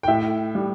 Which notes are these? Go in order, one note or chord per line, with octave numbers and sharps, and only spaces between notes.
G5
A2 E5
G3